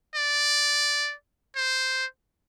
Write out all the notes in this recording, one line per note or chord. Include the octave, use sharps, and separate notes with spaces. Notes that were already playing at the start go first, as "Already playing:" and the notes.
D5
C5